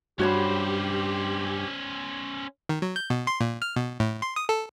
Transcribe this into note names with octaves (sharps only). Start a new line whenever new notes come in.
G2 C#4 F#4 G4 C5 C#5 B5
D#3
F#3
G6
B2
C6
A#2
F6
B2
A2
C6
D#6
A4